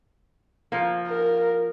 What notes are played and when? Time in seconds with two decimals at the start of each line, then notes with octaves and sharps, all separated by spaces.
0.72 F3 A#3
1.08 A#4